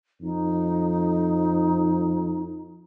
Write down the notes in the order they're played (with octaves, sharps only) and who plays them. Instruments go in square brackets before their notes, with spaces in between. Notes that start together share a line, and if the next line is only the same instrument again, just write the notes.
[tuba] F2 [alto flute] D#4